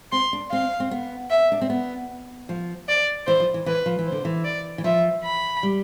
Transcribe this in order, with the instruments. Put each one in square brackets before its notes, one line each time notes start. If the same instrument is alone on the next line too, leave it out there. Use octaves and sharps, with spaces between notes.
[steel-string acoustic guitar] C4 [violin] C6
[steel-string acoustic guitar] D4
[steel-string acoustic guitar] C4 [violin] F5
[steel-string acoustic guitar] C4
B3
[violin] E5
[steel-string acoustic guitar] D4
C4
B3
F3
[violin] D5
[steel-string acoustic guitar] E3 [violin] C5
[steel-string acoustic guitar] F3
E3
[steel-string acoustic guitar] E3 [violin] B4
[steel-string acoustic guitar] F3
E3
[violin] C5
[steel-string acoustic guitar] D3
E3
[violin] D5
[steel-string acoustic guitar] E3
[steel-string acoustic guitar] F3 [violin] E5
[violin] B5
[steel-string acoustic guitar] G3